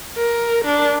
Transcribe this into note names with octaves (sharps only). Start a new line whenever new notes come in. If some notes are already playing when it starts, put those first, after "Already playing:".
A#4
D4